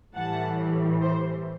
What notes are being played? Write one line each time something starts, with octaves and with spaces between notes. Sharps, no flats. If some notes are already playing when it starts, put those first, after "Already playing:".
A2 E3 G3 F#5 A5
C5